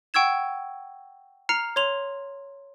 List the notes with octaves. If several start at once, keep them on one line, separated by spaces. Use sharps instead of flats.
F#5 G5 C#6 E6 G#6 E7
A#5 F6 C7 C#7 F7
C#5 C6 F7